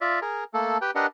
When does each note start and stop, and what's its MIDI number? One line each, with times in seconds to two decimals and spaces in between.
0.01 0.19 65
0.01 0.19 74
0.01 0.19 76
0.22 0.44 68
0.22 0.44 70
0.54 0.78 57
0.54 0.78 58
0.54 0.78 69
0.82 0.91 67
0.82 0.91 71
0.82 0.91 79
0.95 1.06 62
0.95 1.06 67
0.95 1.06 70
0.95 1.06 71
0.95 1.06 75
0.95 1.06 78